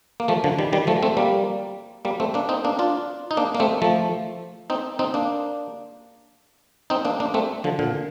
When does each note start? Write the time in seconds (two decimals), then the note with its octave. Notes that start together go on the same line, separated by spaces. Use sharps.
0.20 A#3
0.28 F3 A3
0.44 D3 F3
0.58 D#3 G3
0.73 D#3 G3
0.87 F3 A3
1.03 A3 C4
1.17 G3 A#3
2.05 G3 A#3
2.20 A3 C4
2.34 A#3 D4
2.49 C4 D#4
2.64 A#3 D4
2.79 D4 F4
3.31 D#4
3.37 A#3 D4
3.55 A#3
3.60 A3 C4
3.82 F3 A3
4.70 C4 D#4
4.99 C4 D#4
5.14 A#3 D4
6.90 C4 D#4
7.05 A#3 D4
7.20 A#3 D4
7.34 A3 C4
7.64 D3 F3
7.79 A#2 D3